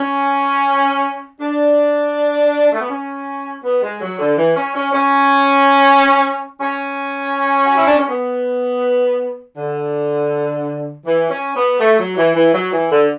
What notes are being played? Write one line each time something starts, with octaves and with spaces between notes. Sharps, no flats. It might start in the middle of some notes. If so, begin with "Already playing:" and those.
Already playing: C#4
D4
A3
B3
C#4
B3
G#3
F#3
D3
E3
C#4
C#4
C#4
C#4
F#4
E4
D4
C#4
B3
D3
E3
C#4
B3
A3
F#3
E3
E3
F#3
E3
D3